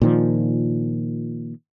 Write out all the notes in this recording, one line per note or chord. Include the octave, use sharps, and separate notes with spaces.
A#2 D#3 F3